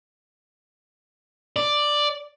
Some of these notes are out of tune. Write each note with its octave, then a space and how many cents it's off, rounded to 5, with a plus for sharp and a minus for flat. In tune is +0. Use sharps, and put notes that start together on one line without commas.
D5 +5